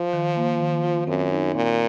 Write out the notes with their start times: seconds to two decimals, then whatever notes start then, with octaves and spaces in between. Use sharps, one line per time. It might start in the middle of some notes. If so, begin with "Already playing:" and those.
Already playing: F3
0.13 D#3
0.36 A#3
0.60 D#3
0.84 F4
1.07 F#2 C4
1.31 D#4
1.54 A#2 C4